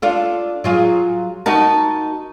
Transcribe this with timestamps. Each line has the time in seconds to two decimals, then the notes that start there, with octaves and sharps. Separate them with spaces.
0.02 D4 F4 A4
0.64 F#3 F4 G#4
1.46 D#4 F#4 A#4 A5